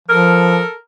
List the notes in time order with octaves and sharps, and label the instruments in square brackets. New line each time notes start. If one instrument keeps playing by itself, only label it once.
[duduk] F3 [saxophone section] A4 A#4